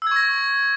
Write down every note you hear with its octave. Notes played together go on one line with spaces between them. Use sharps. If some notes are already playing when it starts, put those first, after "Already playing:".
C#6 E6 G#6 A#6